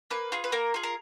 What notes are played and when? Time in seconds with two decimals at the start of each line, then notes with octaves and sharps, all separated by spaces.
0.10 A#3 B4
0.32 F4 G#4
0.44 B4
0.52 A#3 A#4
0.74 F4 G#4
0.83 A#4